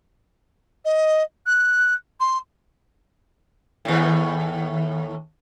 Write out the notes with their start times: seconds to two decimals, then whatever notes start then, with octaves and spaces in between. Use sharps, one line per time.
0.85 D#5
1.46 F#6
2.20 C6
3.85 D#2 A2